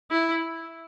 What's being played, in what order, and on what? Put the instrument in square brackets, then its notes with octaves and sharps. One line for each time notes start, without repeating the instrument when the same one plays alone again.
[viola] E4